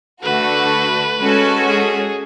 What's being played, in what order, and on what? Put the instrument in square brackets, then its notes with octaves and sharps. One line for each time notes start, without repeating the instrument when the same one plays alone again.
[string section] D3 A3 D4 F#4 [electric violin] B4
[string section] G#3 C#4 F#4 A4
[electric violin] G#4